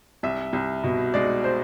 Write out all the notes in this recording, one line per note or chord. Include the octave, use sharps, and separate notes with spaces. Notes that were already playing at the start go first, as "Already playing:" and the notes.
C2 E5
C2
B2
G#3 D5
C5